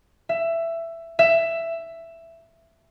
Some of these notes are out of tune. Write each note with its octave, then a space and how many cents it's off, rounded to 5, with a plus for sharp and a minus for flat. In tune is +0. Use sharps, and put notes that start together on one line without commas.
E5 +15
E5 +10